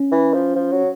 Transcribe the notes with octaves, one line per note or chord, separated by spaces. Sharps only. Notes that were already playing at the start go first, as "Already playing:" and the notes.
Already playing: C#4
E3
F3
F3
F#3